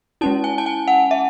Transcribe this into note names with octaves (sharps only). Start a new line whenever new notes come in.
G#3 C#4 E4 A5
G#5
A5
G#5
F#5
E5